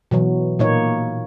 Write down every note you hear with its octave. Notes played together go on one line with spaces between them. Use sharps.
B2 E3 F#3
A#2 A#3 D#4 C#5